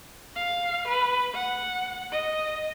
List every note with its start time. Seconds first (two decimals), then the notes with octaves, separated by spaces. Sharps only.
0.36 F5
0.88 B4
1.34 F#5
2.12 D#5